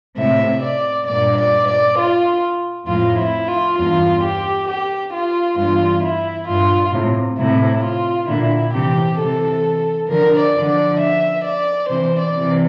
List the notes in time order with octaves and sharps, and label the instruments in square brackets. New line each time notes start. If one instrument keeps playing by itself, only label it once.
[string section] A2 C3 [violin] E5
[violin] D5
[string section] G2 A#2 [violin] D5
[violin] D5
D5
F4
[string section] F2 A2 [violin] F4
[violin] E4
F4
[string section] E2 G2 [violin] F4
[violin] G4
G4
F4
[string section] E2 G2 [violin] F4
[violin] E4
[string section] G2 A#2 [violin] F4
[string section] A2 C3
[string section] A2 C3 [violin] E4
[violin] F4
[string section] A#2 D3 [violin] E4
[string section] C3 E3 [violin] G4
[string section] C3 E3 [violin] A4
[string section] D3 F3 [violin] A#4
[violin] D5
[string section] D3 F3
[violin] D5
E5
D5
[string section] C3 E3 [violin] C5
[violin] D5
[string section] C3 E3